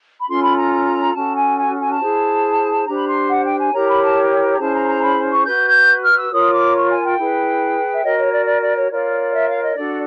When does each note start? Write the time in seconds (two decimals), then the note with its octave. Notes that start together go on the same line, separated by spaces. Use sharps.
0.20 B5
0.27 C#4 F4 A4 C6
0.41 B5
0.55 A#5
1.13 C#4 F#4 A4 A5
1.34 G#5
1.56 G#5
1.77 G#5
1.89 A5
1.99 E4 G#4 C5
2.86 D4 G4 C5 A#5
2.96 B5
3.06 C6
3.28 F#5
3.44 G5
3.58 G#5
3.71 E4 G4 A#4 C#5 A#5
3.87 B5
4.01 A5
4.53 A#5
4.58 C#4 E4 G#4 C5 A5
4.73 A#5
4.86 A#5
5.01 B5
5.30 C#6
5.44 F#4 B4 G6
5.66 G6
6.02 F6
6.16 E6
6.31 F4 A#4 C#5 D#6
6.52 D6
6.73 C#6
6.89 G#5
7.03 G5
7.17 E4 G#4 B4
7.91 E5
8.02 F#4 A#4 C#5 D#5
8.17 C#5
8.32 D5
8.46 D5
8.61 D5
8.74 C#5
8.89 F4 A#4 C#5 D5
9.32 E5
9.47 F5
9.61 D#5
9.75 D4 F#4 A4 D5